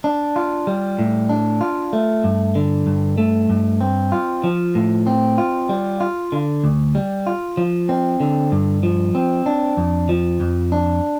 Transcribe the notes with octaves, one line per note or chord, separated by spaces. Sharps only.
D4
F4
G3
A2
D4
F4
A3
G2
D3
G2
A3
G2
C4
F4
F3
A2
C4
F4
G3
F4
D3
D2
G3
F4
F3
C4
D3
G2
F3
C4
D4
F2
F3
F2
D4